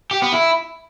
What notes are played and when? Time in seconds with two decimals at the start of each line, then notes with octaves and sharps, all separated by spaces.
0.11 G4
0.22 B3
0.32 E4